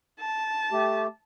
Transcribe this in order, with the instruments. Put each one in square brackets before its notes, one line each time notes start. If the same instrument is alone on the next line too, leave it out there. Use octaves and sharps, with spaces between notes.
[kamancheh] A5
[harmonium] A3 G4